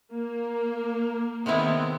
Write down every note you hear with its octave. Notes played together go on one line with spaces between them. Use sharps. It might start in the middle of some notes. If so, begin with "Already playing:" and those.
A#3
C3 D#3 G#3 B3 C4 E4